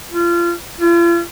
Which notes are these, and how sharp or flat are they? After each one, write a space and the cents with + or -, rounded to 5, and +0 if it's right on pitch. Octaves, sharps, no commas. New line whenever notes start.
F4 -25
F4 -40